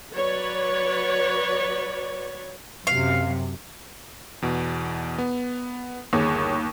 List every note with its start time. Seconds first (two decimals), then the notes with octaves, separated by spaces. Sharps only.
0.11 F#3 B4 C#5 D5
2.87 F#2 C3 F5
4.42 E2 B2
5.18 B3
6.13 G1 D#2 G#4 C#5